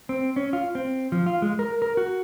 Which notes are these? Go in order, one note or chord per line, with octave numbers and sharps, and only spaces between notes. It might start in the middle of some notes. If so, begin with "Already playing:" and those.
C4
C#4
F4
C4
F3
F4
G#3
A#4
A#4
F#4